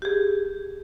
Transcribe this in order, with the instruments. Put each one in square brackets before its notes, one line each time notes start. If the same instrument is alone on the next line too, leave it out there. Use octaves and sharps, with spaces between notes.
[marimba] G4 G#4